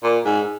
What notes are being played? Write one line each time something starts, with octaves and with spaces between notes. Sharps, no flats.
A#2
G#2